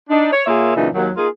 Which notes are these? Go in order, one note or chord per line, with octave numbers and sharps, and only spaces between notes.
D4 D#4
C#5
A#2 A#3 F4 G#4 C#5 E5
F#2 A#2 C#3 E3 D4 D#4
D#2 F#3
A#3 D#4 F4 G#4